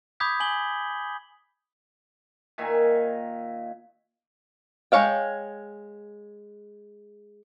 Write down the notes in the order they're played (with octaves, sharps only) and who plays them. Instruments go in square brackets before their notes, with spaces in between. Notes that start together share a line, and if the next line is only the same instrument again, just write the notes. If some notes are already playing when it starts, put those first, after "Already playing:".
[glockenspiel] B5 D6 D#6 G6 G#6 B6
G#5 F#7 G7
[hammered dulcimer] A#2 D#3 E5 G#5
[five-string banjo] G#3 D#4 C#5 F5 G5